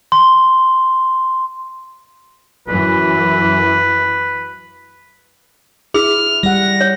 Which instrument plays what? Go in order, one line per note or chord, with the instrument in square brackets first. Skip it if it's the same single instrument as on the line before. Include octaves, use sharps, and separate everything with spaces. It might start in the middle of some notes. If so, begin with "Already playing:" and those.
[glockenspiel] C6
[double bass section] F#2 E3 [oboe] B4
[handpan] E4 [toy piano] G#4 E6 [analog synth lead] F6
[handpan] G3 F#5 [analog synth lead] A#6
[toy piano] C#5